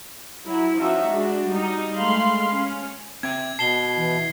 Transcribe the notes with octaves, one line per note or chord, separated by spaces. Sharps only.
F#3 E4
F3 C#4 D#4 F#4 E5
G#3 D4 F#4
G3 D#4
G#3 A3 F5 B5 C6
C#4
C4 E5 G5 G#6
B2 A5 C7 G7
E3